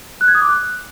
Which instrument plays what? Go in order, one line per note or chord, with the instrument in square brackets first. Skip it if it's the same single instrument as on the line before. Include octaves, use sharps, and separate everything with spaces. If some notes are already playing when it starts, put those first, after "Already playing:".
[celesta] F#6
G#6
D#6
D6
F#6